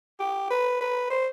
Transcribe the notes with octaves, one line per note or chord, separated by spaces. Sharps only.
G4
B4
B4
C5